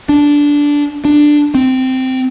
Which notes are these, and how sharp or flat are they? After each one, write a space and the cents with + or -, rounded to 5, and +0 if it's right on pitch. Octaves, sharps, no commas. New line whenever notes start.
D4 -10
D4 +10
C4 -10